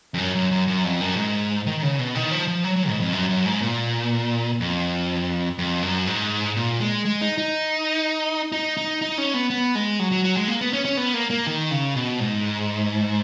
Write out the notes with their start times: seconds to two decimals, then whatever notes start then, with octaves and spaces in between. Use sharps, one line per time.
0.14 F2
0.18 F#2
0.35 F#2
0.51 F#2
0.67 F#2
0.84 F2
1.01 F#2
1.17 G#2
1.66 D#3
1.82 C#3
1.99 B2
2.15 D#3
2.32 F3
2.48 F3
2.64 F#3
2.76 F#3
2.89 G#2
3.00 F2
3.13 F#2
3.29 F#2
3.46 G#2
3.62 A#2
4.60 F2
5.58 F2
5.83 F#2
6.07 G#2
6.56 A#2
6.81 G#3
7.05 G#3
7.21 D#4
7.38 D#4
8.52 D#4
8.77 D#4
9.01 D#4
9.18 C#4
9.34 B3
9.50 B3
9.75 G#3
9.99 F#3
10.11 F#3
10.24 F#3
10.37 G#3
10.48 A#3
10.61 B3
10.73 C#4
10.85 C#4
10.97 B3
11.14 A#3
11.31 A#3
11.47 D#3
11.71 C#3
11.96 B2
12.20 G#2